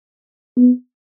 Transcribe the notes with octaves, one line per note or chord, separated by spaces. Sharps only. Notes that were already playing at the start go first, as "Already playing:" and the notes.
B3